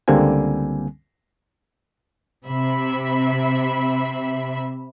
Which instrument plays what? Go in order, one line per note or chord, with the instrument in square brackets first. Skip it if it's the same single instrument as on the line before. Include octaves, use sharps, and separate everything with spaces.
[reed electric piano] C#2 D3 G3 A#3 C4 G#5
[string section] C3 E5 B5